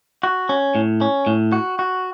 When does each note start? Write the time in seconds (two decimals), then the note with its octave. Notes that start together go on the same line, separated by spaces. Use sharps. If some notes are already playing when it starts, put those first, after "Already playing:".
0.23 F#4
0.49 C#4
0.75 A2
1.01 C#4
1.27 A2
1.52 F#4
1.79 F#4